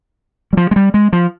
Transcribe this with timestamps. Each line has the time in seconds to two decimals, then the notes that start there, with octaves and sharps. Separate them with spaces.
0.53 G3
0.57 F3
0.71 G#3
0.76 G3
0.94 G#3
1.13 F3